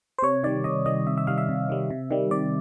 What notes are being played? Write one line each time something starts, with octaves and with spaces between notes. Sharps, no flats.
C5
C3 C#5
D#3 G3 D5
C3 D#5
D#3 G3 D#5
C3 E5
E5
D#3 G3 F5
E5
C3
D#3 G3
C3
D#3 G3
C3 D5